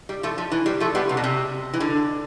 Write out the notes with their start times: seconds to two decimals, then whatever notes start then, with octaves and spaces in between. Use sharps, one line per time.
0.09 G3
0.23 F3 A3
0.38 F3
0.52 E3
0.66 G3
0.80 F3 A3
0.95 G3 B3
1.09 C3
1.17 B2
1.24 C3
1.73 E3
1.80 D3